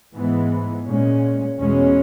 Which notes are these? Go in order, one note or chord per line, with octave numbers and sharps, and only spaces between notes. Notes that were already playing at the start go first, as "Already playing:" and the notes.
G#2 E3 G#3 B3
A#2 G#3 C#4
E2 B2 G#3 C#4